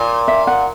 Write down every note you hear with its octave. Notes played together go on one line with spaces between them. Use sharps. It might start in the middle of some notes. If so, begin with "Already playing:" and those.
Already playing: A#2
E5
F#5